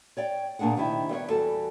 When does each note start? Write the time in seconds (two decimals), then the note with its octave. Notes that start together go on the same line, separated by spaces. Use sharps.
0.17 C#5 D5 G5
0.59 A#2 A#3 D4 G#4 F#5
0.77 C3 D#3 D4 E4 G4
1.09 G3 B3 E4 C#5
1.30 E2 G3 F#4 A4